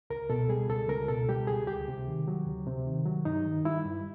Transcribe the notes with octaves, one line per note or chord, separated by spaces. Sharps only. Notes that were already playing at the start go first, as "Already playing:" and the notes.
C#2 A#4
B2 A4
G3 G#4
C#2 A4
C#2 A#4
B2 A4
G3 G4
C#2 G#4
D2 G4
C3
D#3
F#3
D2
C3
D#3
F#3
G2 D#4
D#3
G3 E4
G2